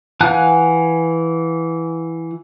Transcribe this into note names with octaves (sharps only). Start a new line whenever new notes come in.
E3 F5 F#5 G#5 F#6